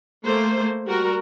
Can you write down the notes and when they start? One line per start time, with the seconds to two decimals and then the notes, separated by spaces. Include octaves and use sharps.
0.24 A3 A#3 C5
0.86 G3 F#4 A#4